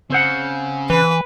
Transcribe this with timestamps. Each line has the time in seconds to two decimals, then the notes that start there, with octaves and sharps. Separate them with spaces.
0.10 C#3 C4 C5 F#5
0.90 E3 B4